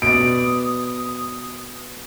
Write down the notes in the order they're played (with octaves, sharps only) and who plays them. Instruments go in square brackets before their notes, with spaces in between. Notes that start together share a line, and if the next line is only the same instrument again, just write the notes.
[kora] B2 D5 [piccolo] D#6 [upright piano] D7